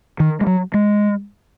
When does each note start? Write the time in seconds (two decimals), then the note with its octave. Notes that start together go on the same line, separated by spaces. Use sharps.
0.20 D#3
0.41 G#3
0.47 F#3
0.74 G#3